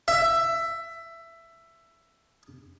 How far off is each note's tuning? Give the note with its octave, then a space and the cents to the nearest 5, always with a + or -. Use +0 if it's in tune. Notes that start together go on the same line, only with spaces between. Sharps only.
E5 +15